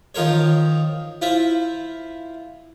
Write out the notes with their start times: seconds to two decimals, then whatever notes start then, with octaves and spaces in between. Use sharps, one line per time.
0.15 D#3 F3 A#4 C5 C#5
1.22 E4 F4 C5 E5